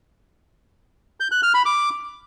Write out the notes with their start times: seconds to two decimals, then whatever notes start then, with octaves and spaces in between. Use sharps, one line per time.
1.20 G6
1.32 F#6
1.43 F6
1.54 B5
1.66 D6